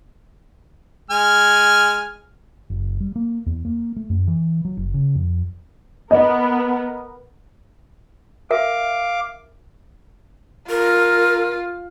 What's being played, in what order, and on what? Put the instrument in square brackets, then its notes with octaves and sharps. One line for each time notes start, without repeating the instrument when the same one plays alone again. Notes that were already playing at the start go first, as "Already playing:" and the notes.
[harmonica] G#3 G#5 F6
[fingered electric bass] F#1
G3
A#3
E2
A#3
A3
F#2
E3
F#3
F#1
C#3
F2
[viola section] B3 A#4 [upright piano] D#5
[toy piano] A#4 E5 [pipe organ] F5 D6
[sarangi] F4 [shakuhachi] A#4